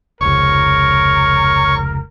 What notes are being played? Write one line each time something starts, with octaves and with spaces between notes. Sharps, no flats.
F1 C#2 A#4 C#5 C#6